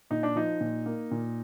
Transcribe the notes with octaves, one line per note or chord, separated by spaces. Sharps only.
A#2 D#4
D4
F3 D#4
A#2
A#3
A#2